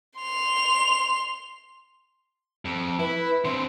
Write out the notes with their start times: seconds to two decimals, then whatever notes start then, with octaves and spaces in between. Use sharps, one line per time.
0.19 C6 F7
2.65 F2
2.99 E4 B4
3.45 D3 C4 C6